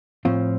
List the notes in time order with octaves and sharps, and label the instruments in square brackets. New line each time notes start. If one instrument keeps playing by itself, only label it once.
[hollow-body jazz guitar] A2 F3 C4 F4